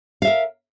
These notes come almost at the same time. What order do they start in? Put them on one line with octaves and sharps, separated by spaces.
F5 E5 A#4